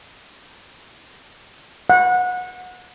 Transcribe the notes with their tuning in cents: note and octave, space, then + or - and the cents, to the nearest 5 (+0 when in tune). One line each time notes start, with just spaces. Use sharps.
F#5 -25